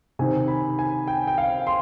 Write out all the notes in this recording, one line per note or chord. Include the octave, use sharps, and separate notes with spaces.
C3 D#3 G#5
B5
G#5
G5
G5
F5
C6